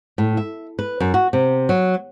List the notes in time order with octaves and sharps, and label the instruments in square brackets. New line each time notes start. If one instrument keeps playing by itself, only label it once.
[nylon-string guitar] A2
E5
B4
F#2
F#4
C3
F#3